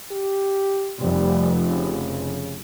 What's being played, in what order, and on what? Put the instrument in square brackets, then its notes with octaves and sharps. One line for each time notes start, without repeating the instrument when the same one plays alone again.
[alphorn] G4
[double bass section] F1 [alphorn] G3
[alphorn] C#3